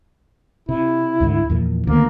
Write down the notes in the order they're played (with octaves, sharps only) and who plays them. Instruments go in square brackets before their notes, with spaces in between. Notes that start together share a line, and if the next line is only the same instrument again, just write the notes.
[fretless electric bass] C3 [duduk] E4
[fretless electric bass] D2 G#2 D3
E2 A#2 F3
[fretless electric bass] D2 D#3 B3 [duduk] A#3